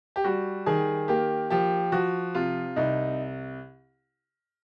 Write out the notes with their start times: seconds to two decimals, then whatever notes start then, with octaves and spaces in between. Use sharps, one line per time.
0.16 G4
0.24 G3 F#4
0.66 D#3 G#4
1.08 A#3 G4
1.50 F3 G4
1.92 F3 F#4
2.35 C3 F4
2.76 C2 D#4